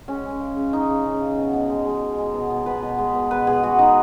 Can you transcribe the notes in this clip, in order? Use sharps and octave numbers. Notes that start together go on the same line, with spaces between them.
G#3 C#4
G#3
C#3
C#3
G#3 D#4
C#3
C#3
C#3
B2
B2
G#3
G#3
G#3
G#3
B2
B2
B2 B4
B2
G#3
B2
B2 B4
B2 G#4
G#3 F#4
G#3 D#4